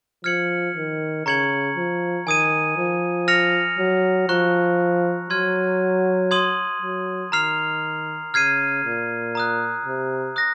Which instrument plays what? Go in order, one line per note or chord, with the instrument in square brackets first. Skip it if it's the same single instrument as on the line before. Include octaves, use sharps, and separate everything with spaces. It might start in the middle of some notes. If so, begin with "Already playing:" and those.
[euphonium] F3 [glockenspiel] F6 G#6 C#7 F#7
[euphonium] D#3
[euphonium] C#3 [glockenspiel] A#5 C#6 G#6 C#7 F#7
[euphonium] F3
[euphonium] D#3 [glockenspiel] G#5 D#6 G#6 D#7
[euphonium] F3
[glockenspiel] F6 A#6 C#7 F7
[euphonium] F#3
[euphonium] F3 [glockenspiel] A#5 C#6 F#6
[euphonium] F#3 [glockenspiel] C6 F6 G#6 D#7
[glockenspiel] C6 D#6 G#6 D#7 F#7
[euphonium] F#3
[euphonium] D#3 [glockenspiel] A#5 F6 C7 F7
[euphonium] C#3 [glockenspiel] F6 G#6 C7 D#7
[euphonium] A#2
[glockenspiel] A#5 D#6 F#6
[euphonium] C3
[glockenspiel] D#6 F#6 A#6